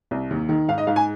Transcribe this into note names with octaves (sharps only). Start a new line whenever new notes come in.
C2
D#2
D#3
G#2 F5
D#5
G#2 F5
G#5